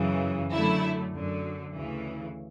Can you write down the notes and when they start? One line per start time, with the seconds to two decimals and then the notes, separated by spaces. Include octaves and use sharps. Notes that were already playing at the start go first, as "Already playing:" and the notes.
Already playing: F#2 C#3 E3
0.51 F#2 D3 F#3 A3 E4
1.13 F#2 D3 F#3
1.75 D2 C#3 E3